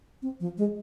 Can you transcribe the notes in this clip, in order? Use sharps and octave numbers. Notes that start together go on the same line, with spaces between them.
C4
F3
G#3